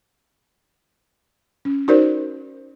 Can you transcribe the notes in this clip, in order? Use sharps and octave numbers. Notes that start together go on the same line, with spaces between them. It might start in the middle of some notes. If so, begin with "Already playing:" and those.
C#4
D#4 F#4 A#4 C5 D5